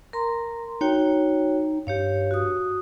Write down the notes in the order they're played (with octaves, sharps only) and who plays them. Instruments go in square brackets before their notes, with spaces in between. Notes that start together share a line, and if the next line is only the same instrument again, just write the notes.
[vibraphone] A#4 A#5 C6
[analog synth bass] D#4 [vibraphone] F#4 C#5 G5
[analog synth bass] G2 [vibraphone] G4 C#5 F5
[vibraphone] F#4 D#6